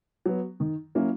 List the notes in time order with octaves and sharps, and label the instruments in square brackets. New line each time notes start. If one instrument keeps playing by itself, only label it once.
[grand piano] F#3 B3
D#3
F#3 A#3 C#4 E4